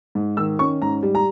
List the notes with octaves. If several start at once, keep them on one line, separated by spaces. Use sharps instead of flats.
G#2
D#3 E6
C#4 C#6
G#2 A#5
G3
A#5